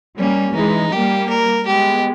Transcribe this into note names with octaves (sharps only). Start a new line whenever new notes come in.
G3 A#3 C#4
E3 G#3 D#4
G3 A#3 G4
A#4
G#3 B3 G4